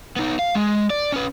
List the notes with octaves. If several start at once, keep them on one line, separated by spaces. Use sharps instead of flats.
B3 D#4
F5
G#3
D5
C#4 B4